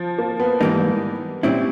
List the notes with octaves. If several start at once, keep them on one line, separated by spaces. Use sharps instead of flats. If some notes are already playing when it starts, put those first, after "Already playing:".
Already playing: F3
A#3
B3
G#2 E3 G3 A#3 D#4
A#2 G3 C4 C#4 E4